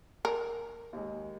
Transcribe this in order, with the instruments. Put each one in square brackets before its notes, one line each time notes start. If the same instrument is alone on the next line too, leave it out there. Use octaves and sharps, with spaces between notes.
[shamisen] A#4
[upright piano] D#2 G#3